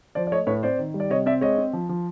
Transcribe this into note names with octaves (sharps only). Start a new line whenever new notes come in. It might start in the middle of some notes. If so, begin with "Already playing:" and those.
F3 C5 D5
D5
A3 C#5 D#5
A2 B4 C#5
C4 C5 D5
D#3
G3
D5
C3 C#5 D#5
C4 D5 E5
G#3 C#5 D#5
C4
F3
F3